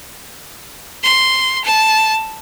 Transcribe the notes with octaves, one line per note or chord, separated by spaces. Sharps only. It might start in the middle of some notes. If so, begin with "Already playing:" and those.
C6
A5